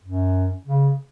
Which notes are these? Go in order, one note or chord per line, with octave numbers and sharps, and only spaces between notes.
F#2
C#3